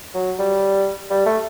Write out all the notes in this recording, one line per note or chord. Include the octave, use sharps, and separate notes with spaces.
F#3
G3
G3
A3